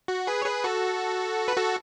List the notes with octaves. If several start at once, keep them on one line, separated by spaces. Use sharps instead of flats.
F#4
G#4 B4
C#5
G#4 B4
F#4 A4
B4
F#4 A4